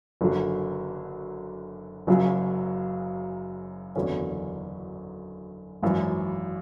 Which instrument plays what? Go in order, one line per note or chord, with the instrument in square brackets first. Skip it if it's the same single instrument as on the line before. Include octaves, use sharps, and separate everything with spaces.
[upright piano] F#1 F#2 D3 F#3
F#1 F#2 C#3 F#3
F#1 E2 D3 F#3 C#4
G#1 F#2 E3